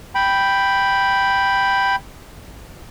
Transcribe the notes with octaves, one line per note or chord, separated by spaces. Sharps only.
G5 B5